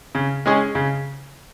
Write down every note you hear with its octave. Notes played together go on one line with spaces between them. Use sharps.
C#3
G#3 C#4 G#4
C#3